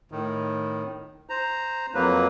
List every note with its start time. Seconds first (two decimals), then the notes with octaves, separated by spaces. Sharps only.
0.12 A2 D#3
1.29 C5 A#5
1.94 F2 F#3 A#3 B4